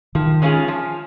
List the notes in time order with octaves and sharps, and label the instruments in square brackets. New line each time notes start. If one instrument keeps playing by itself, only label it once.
[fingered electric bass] D#3 [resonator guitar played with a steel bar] F3
[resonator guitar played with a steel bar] G#3 C#4 F4 G#4
F3